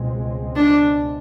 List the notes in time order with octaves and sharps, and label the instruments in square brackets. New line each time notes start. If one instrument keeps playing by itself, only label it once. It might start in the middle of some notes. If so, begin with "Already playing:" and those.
Already playing: [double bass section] C#2 B2 G#3 C4
[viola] D4